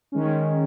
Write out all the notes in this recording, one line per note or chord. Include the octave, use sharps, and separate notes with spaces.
D#3 G#3 C#4